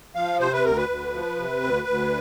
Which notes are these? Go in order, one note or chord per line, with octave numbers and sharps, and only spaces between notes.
F3 F5
C3 C5
B4
D2 A#4
B4
D2
F3
C3
D2
D2